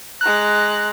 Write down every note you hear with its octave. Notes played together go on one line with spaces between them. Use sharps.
G#3 A#5 F#6